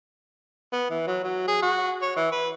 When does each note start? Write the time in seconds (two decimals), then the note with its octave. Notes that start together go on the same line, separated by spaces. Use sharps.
0.72 B3
0.90 E3
1.07 F#3
1.24 F#3
1.48 G#4
1.62 F#4
2.02 C#5
2.16 E3
2.32 B4